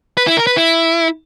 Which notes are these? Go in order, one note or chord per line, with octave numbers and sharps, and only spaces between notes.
B4
E4
A#4
B4
E4